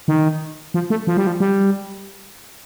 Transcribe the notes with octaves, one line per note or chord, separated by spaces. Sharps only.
D#3
F3
A3
F3
G3
F3
G3